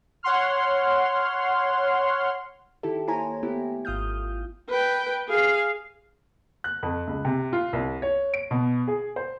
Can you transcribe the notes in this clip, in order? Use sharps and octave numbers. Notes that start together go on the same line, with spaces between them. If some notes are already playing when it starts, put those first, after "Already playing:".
C#5 F#5 C6 F6
D#3 E4 G4 A4
A#3 E4 C5 C#5 G#5 A#5
A3 B3 E4 G4
G#1 F4 D#6 F6 G6
B4 G5
G#4 F5
F#6
F2
C#2
C3
F4
C2
C#5
D7
B2
G#4
C5